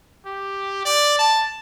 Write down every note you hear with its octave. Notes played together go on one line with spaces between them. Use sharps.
G4
D5
A5